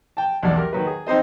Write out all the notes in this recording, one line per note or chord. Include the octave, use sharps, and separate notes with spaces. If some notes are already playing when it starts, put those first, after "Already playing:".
G5 A5
B1 E2 D5 F#5
G4 A#4
D#3 F#3 B4
G#4
C4 D#4 C5 D#5